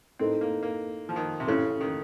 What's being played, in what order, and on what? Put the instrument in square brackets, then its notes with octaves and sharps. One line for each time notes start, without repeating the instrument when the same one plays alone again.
[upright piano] A2 A3 D#4 A#4 [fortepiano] C4
[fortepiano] A#3
A#3
F3
D#3
C3
[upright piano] A1 A2 A3 [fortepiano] C#3
[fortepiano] D#3